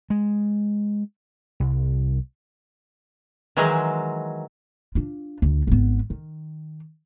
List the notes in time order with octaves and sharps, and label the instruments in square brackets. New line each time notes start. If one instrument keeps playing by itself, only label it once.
[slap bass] G#3
C2
[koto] D#3 E3 F#3 G#3 C5
[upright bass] D4 F4
D2
G#1 B3
D#3